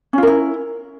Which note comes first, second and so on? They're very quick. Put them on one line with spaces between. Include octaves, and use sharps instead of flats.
C#4 F4 A#4 E4